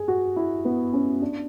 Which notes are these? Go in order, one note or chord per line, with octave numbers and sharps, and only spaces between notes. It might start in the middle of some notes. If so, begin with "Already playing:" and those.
Already playing: G#4
F#4
E4
B3
C#4
D4